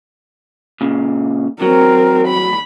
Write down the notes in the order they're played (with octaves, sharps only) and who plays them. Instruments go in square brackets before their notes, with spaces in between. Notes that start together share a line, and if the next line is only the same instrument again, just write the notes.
[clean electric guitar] A#2 C#3
[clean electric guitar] F#3 [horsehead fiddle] C4 A#4
[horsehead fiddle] B5